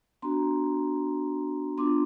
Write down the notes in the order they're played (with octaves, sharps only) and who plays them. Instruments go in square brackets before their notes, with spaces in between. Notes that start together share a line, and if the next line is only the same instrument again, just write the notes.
[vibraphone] B3 D4 F#4 A#5 C6
B3 D4 F4 C6 D6